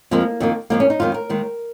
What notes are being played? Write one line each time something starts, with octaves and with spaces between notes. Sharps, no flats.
F2 F3 G#3 A#3
F2 D#3 A#3
F2 F3 G#3 A#3
C#4
D#4
F2 D#3 G#3 F4
A#4
D#2 D#3 G#3